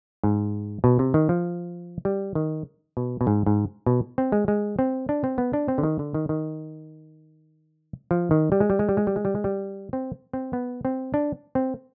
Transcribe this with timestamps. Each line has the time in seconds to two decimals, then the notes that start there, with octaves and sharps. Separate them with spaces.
0.24 G#2
0.84 B2
0.99 C3
1.14 D#3
1.29 F3
2.05 G3
2.35 D#3
2.97 B2
3.21 B2
3.27 G#2
3.46 G#2
3.86 B2
4.18 C4
4.32 G#3
4.48 G#3
4.79 C4
5.09 D4
5.24 C4
5.38 B3
5.53 D4
5.68 C4
5.78 D3
5.83 D#3
5.99 D3
6.14 D#3
6.29 D#3
8.11 F3
8.31 D#3
8.52 G3
8.60 G#3
8.70 G3
8.79 G#3
8.89 G3
8.97 G#3
9.07 G3
9.16 G#3
9.25 G3
9.35 G#3
9.44 G3
9.93 C4
10.33 C4
10.53 B3
10.85 C4
11.14 D4
11.55 C4